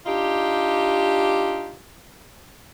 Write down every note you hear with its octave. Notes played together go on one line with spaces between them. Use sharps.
D4 D#4 F4 G4